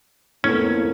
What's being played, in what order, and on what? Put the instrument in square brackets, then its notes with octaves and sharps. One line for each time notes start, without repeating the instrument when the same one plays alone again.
[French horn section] F2 A#3 B3 [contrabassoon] A2 [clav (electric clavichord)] C#4